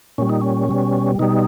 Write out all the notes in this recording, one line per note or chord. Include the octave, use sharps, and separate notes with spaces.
A#2 G3 C#4
D#4
C#4
B2 G3
B2 G3 D#4